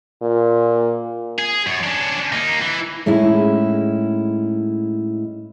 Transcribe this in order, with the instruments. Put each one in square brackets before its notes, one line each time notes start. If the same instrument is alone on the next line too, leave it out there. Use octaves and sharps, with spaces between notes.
[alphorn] A#2
[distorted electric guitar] G#4
F#2
C#4 D4
A#3 D#4
E3
[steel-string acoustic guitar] A2 G#3 C#4 D#4 E4